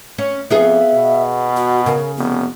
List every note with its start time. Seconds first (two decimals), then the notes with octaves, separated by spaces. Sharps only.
0.18 C#4
0.50 F2 B3 F4 G#4 E5
0.94 B2
1.56 F#4
1.86 C#3 A#4
2.17 F1 B3